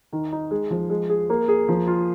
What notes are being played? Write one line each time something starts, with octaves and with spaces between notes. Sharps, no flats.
D#3
D#4
G#3
F3
G#3
G#4
A#3
G#4
F3
F4